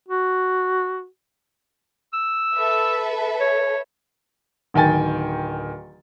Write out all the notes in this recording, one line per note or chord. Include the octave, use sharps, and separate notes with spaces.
F#4
E6
A4 B4 E5
C#5
D1 D#3 G5 G#5 A6